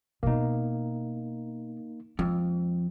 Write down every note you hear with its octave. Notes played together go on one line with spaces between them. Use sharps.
B2 A#3 B3 D#4
F2 G#3